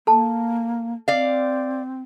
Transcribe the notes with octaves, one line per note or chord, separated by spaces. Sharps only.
A#3 A4 A5
C4 D5 F5